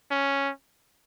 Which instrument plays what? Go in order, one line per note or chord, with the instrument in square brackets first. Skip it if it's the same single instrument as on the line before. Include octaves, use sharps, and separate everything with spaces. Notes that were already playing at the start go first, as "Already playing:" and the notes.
[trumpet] C#4